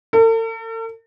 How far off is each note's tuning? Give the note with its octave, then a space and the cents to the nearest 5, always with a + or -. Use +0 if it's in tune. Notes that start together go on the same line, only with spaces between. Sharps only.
A4 +45